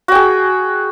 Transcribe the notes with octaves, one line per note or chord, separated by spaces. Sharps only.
F#4 G#4 G5